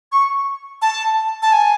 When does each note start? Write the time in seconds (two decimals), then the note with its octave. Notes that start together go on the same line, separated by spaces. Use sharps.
0.12 C#6
0.82 A5
1.42 A5
1.52 G#5